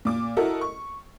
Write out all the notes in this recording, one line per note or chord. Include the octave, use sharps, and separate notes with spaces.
A#2 D6
E4 F#4 A4 A#4 D#5
C#6